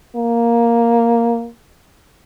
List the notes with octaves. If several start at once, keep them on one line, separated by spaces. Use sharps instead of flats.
A#3